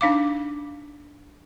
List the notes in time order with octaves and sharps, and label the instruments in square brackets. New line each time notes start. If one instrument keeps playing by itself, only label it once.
[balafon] D4 D#4 F5 D6